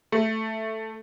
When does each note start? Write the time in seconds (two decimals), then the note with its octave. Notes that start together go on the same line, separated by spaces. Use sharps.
0.12 A3